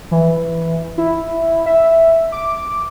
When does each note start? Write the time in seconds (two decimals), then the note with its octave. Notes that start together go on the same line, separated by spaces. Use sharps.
0.11 E3
0.98 E4
1.66 E5
2.32 D6